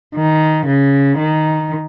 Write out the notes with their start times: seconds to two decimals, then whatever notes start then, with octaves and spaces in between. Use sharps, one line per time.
0.15 D#3
0.66 C#3
1.18 D#3